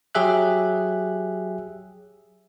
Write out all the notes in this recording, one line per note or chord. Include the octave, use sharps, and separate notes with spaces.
F#3 G4 G#4 E5 F#6